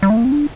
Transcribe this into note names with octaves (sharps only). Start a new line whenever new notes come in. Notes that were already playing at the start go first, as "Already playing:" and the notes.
G3
A3
A#3
C4
D4